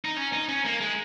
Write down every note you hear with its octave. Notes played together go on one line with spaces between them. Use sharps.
D#4
C#4
D#4
C#4
A#3
G#3